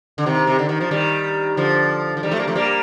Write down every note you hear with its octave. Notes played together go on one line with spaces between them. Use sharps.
D3
C3 D#3
C3
D3
D#3
F3
D#3 G3
D3 F3
F3
D#3 G3
F3 A3
G3 A#3
F3 A3
G3 A#3